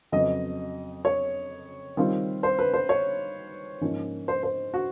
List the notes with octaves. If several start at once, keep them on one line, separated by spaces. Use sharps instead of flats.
F2 C#3 F#3 B3 D#5
C#5
D#3 G3 C4 F4
C5
B4
C5
C#5
G#2 F3 A#3 C#4
C5
C5
F#4